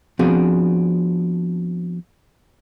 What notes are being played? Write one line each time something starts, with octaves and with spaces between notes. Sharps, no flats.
F3 B3 C4 D4 F#4 G#4